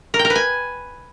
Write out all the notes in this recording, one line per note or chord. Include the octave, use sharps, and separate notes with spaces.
A#4
G5
A#4
B4
G#5